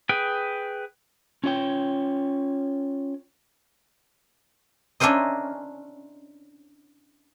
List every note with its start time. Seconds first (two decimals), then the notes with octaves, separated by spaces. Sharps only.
0.09 G#4 B4 G5
1.44 C#4 F4 C#5 G5
5.00 C#4 D4 E4 A#4 C5 D#5